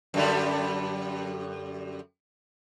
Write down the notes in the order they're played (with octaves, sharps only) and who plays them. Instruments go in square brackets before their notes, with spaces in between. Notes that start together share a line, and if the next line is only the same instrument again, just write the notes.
[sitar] F#2 D3 G3